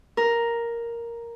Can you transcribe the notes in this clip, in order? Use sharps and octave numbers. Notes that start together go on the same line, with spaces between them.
A#4